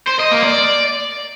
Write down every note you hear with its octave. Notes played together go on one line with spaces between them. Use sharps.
C5
D#5
A#3
D5